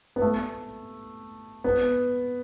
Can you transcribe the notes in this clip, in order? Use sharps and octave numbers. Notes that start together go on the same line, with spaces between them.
B3
A3
B3